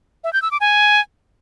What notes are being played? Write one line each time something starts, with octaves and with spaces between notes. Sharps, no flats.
E5
G6
E6
D6
G#5